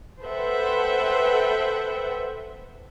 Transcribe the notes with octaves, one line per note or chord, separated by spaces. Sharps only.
A4 B4 C5 E5 F#5 G5